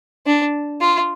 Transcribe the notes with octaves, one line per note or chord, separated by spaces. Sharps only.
D4
F4